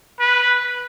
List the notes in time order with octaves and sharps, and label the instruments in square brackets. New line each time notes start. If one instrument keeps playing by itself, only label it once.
[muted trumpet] B4